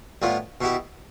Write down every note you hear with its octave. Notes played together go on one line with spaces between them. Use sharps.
A2 G3 B3 F4
B2 B3 E4 G4